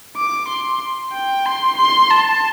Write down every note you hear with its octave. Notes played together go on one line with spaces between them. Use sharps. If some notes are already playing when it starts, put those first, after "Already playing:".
D6
C6
G5
C6
C6
A5